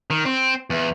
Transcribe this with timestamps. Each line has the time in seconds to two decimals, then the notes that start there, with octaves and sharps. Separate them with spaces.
0.10 D#3
0.25 C4
0.70 E2